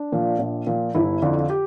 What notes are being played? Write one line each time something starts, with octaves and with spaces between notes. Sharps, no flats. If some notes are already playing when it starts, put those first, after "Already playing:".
Already playing: D4
A#2 F3
A#1
A#2 F3
G1 E4
F2 D3 F3
G4